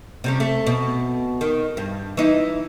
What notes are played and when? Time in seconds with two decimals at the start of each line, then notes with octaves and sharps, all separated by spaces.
0.24 C3 G3 C#4
0.40 A3
0.67 B2
1.41 D#3
1.77 G2
2.17 E3 D#4